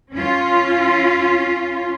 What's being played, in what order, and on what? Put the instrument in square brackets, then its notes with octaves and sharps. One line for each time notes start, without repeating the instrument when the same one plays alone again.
[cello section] C#4 F4